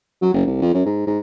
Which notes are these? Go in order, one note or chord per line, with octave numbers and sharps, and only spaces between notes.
F#3
F#1
C2
F2
F#2
G#2
G#2